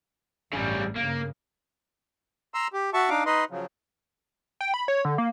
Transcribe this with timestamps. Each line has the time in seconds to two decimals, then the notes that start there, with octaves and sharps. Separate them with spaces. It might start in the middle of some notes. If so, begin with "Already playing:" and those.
0.53 A1 G2 C#3 G3
0.96 G2 C#3 A#3
2.54 A#5 C6 E6
2.73 G4
2.94 F#4 E5 A5 C#6
3.10 D4 D#4 F5 D6
3.26 D#4 B4 D#5 C6
3.50 C#3 F3 F#3
4.61 G5
4.74 B5
4.88 C#5
5.05 D3
5.18 A#3